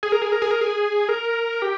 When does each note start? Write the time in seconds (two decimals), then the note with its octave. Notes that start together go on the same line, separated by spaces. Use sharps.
0.03 G#4
0.12 A#4
0.22 G#4
0.32 A#4
0.42 G#4
0.51 A#4
0.61 G#4
1.09 A#4
1.62 G4